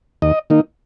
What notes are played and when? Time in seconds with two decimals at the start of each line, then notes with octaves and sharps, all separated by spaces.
0.22 D#2 D#5
0.50 D#3 A#3 D#4